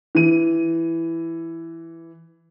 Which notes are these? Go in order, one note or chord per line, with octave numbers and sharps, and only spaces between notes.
E3 D#7